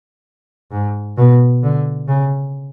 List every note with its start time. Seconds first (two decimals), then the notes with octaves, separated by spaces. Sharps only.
0.72 G#2
1.17 B2
1.62 D3
2.08 C#3